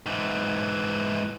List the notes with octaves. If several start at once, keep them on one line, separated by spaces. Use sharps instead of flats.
G#2 E3